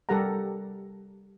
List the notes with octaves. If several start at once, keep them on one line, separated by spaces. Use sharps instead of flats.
G3 G4 A4 A#4 F#5 A#5